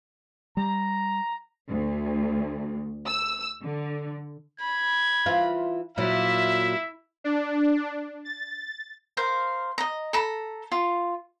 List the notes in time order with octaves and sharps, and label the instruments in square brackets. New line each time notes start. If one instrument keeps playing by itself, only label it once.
[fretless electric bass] G3 [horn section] A#5
[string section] D2
E6
D3
[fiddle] B5 [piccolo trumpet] G#6
[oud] E3 F4
[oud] A#2 F#3 [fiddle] E4 [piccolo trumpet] E5
[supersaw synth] D4
A6
[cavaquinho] A#4 C5 F5
D#5 A#5
A4 A#5 B5
F4